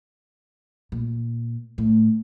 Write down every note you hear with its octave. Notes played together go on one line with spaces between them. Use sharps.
A#2
A2